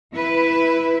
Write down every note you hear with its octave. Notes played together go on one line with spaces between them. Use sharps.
E4 B4